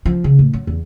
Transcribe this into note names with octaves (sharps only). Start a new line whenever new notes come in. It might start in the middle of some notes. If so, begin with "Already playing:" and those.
F3
C#3
A2
F#3
E2